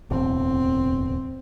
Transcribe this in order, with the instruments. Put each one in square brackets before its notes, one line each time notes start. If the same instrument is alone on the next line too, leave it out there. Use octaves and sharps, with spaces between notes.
[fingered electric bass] D1 E2 B2 [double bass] C4